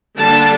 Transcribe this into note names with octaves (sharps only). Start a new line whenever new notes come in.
D3 G3 A#3 D4 A5